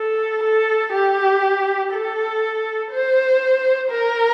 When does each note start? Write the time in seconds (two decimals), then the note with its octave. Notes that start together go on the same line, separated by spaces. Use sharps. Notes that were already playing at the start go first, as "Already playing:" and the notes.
Already playing: A4
0.43 A4
0.93 G4
1.93 A4
2.92 C5
3.91 A#4